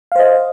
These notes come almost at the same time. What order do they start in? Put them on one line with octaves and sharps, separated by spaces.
F5 C5 D#5